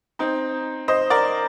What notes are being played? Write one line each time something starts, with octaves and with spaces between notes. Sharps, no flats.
C4 D#4
C5 D#5
A#4 D5